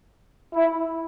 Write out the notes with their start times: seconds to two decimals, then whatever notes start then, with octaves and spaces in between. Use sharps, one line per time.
0.53 E4